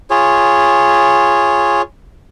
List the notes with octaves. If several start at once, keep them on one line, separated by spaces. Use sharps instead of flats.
F4 G#4 C#5